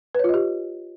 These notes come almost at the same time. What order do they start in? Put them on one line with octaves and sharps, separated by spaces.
B4 C#5 F4 D#5 G4